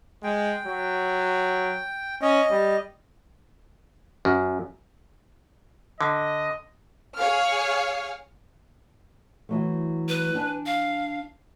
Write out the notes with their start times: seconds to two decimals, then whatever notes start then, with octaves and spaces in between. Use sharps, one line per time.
0.23 G#3 G5
0.67 F#3
2.22 C#4 D#5
2.51 G3
4.25 F#2
6.01 D3 D#5
7.17 G#4 C#5 F5 F6
9.49 E3 F#3 A3
10.08 B4
10.34 D4 G#5
10.66 F5